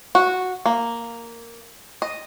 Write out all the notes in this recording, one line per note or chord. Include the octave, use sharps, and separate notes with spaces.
F#4
A#3
D#5